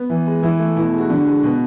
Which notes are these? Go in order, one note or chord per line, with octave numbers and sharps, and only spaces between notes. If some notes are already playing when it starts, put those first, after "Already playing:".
Already playing: B3
E3
G#3
E3 E4
A3
B2 E4
G#3
F#4
D3
G#3
B2